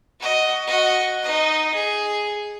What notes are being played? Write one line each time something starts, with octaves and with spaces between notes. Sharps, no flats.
F#4 D#5
F#4 D#5
D#4 D#5
G#4